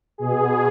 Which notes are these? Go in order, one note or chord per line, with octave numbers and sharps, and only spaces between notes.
B2 G#4